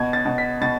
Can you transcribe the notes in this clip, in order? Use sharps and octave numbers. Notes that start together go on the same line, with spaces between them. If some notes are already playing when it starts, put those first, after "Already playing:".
Already playing: B2 G#6
A6
B2
B6
B2 A6